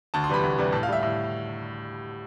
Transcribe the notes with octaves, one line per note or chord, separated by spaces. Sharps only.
D2 A5
C6
C3 E3 G3 B5
D2
C3 E3 G3
A2 A5
F5
G3 E5
A2 E5